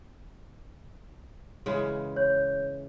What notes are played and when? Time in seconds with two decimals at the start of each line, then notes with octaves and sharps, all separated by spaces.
1.66 C#3 E3 G#3
2.16 C#5 G6